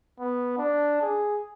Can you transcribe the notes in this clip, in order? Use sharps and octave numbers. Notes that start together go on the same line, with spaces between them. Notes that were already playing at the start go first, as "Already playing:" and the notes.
B3
D4
G#4